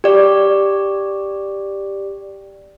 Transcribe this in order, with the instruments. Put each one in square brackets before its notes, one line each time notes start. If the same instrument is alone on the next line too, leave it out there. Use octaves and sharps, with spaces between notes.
[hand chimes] G4 D5